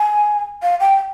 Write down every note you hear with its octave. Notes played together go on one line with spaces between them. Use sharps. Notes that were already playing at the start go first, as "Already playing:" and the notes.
Already playing: G#5
F5
G5